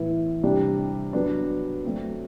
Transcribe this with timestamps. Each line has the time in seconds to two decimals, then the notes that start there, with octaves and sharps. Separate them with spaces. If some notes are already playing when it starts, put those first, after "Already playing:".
Already playing: A2 E3 B3 E4
0.43 C3 G3 D4
1.13 F#3 B3 D4
1.84 F#3 A3 C4